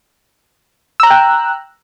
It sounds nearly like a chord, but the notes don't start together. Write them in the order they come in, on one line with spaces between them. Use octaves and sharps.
E6 A#5 F#6 G5